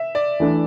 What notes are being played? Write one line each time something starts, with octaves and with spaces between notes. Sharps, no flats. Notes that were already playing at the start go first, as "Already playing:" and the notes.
Already playing: E5
D5
E3 A3 D4